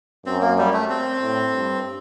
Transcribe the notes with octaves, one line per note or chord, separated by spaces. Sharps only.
F#2 C4
A#3
G3
A3
C4
A2
G2